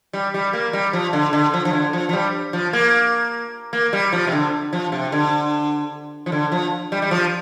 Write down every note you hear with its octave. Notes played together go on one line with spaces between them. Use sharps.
G3
G3
A#3
G3
F3
D3
D3
F3
F3
D3
F3
F3
G3
F3
A#3
A#3
G3
F3
C3
D3
F3
C3
D3
F3
D3
F3
G3
G3
F3